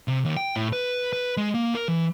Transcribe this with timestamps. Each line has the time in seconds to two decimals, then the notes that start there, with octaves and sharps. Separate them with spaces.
0.08 C3
0.25 D#2
0.37 G5
0.56 A2
0.73 B4
1.13 B4
1.37 G#3
1.54 A#3
1.75 A#4
1.88 E3